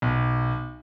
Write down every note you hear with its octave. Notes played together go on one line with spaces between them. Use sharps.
B1